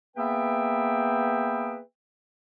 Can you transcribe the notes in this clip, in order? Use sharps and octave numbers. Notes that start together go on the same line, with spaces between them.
A#3 B3 G#4 B4 E5 G5